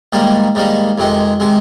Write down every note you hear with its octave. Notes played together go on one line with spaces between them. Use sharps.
G#2 D#3 G3 A#3
G#2 D#3 G3 A#3
F2 C3 D#3 G#3
C3 D#3 G#3